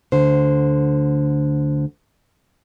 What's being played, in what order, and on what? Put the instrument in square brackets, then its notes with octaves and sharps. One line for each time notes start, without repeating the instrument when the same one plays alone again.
[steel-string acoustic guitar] D2 D3 C5